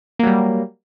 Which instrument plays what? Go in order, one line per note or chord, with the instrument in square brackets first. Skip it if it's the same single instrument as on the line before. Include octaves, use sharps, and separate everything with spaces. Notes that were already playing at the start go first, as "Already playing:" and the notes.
[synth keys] A#3
F#3
G3